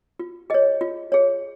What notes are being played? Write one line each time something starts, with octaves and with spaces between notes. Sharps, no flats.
F4
G#4 C#5 D#5
F4
G#4 C#5